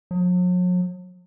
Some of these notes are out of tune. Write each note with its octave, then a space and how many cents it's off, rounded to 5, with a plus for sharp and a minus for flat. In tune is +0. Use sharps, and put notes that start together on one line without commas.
F#3 -45